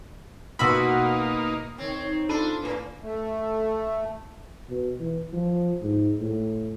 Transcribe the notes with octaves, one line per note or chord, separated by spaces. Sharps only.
B2 A#3 D#4 F4 F#4 B5 E6
D#3 C4 C#5
D#4
D4 F4 A4 B5 D#7
A2 A#3 B4
A3
B2
E3
F3
G#2
A2